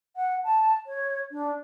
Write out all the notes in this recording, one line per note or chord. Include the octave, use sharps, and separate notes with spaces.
F#5
A5
C#5
D4